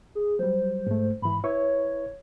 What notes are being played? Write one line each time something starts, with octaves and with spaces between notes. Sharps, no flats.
G#4
F#3 G3 C5
G#2 A3
G#2 E3 B5
E4 B4 C#5 C#6